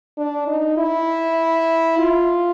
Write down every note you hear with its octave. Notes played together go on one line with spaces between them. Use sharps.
D4
D#4
E4
F4